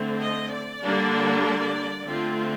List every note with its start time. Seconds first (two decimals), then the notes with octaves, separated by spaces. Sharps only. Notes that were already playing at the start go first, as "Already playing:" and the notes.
Already playing: D3 A3 C4
0.21 D#5
0.52 D5
0.83 D3 G3 A#3 D4
1.45 D5
2.07 D3 A3 C4 F4